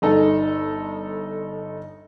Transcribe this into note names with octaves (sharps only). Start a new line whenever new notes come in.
G1 D#4 A4